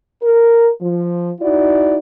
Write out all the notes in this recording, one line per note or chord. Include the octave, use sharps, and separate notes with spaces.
A#4
F3
D#4 E4 F#4 D5